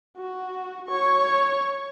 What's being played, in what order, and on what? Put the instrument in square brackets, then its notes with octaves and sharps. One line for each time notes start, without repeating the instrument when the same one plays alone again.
[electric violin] F#4
C#5 C#6